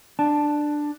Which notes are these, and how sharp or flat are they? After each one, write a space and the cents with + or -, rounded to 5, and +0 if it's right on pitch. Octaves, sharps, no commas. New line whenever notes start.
D4 +15 A5 +0